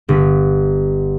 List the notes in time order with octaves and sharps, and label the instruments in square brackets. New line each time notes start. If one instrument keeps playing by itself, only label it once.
[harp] G1 B6